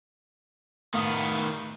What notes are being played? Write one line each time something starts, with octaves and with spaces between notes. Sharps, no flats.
A2 D#3 B3 F5 D#6